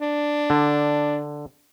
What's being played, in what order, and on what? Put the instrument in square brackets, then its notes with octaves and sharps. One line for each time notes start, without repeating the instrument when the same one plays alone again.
[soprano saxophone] D4
[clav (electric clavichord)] D3